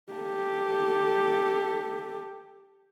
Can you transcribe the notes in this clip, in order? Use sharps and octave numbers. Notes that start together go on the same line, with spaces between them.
G4 A4